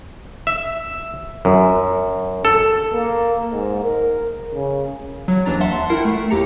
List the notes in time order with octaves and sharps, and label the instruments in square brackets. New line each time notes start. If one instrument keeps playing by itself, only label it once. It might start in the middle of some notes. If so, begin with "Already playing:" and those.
[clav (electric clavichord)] E5
F#2
A4
[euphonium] A#3
G#2
A#4
C#3
[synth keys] F#3
D#2 E3 D4 A#5 A6
E5 F#5 A5 C6
E4 A#4 F#5 G5 C7
A3
D#2 G4 A#5 C#7